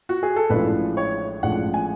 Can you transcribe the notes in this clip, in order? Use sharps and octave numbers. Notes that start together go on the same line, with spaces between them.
F#4
G#4
A4
A1 A2 F3 G#3 D4 B4
C#5
A1 A2 F3 G#3 D4 F#5
G#5